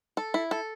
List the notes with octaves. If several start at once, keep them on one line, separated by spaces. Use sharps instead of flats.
A4
E4
A4